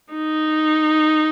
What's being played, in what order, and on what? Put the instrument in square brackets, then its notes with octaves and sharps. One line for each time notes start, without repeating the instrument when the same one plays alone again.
[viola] D#4